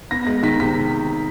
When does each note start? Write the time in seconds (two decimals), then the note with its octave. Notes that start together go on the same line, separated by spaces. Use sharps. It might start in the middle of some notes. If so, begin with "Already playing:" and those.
0.11 B3 A#6
0.27 G#3 A#6
0.43 D#3 B6
0.59 C3 B6